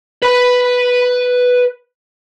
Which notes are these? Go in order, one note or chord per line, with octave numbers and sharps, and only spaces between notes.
B4 B5